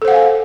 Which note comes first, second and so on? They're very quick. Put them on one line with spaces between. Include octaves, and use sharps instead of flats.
A4 C5 F#5 F5 G#5